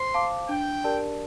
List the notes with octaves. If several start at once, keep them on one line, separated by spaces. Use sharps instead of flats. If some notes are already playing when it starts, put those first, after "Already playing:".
Already playing: C5 C6
F5 A5 D6
D4 G5
G4 A#4 D5 A5